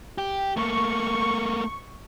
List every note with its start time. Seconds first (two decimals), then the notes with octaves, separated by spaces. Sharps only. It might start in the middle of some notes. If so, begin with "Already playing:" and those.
0.18 G4
0.57 A3 A#3 C#6